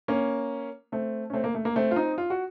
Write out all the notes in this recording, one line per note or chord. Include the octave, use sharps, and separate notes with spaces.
A#3 C#4
A3 C4
C#4
A3 C4
A#3
A3
A#3
A3 C4
F4
C4 D#4
F4
F#4